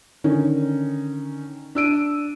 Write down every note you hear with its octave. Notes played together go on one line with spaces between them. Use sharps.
D3 D#3 C#4 D#4
D4 E6 D7 D#7